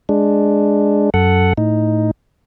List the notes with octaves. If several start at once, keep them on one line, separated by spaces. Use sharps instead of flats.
G#3 D4
F#2 A4 F#5
A2 D#4